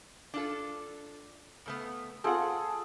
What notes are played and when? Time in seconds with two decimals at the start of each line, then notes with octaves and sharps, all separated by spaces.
0.34 D4 F4 A4
1.66 C#3 A3 B3
2.24 C4 F4 G#4 A4 F#5